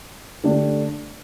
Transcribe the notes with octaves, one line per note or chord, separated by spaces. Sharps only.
D3 A3 D4 G4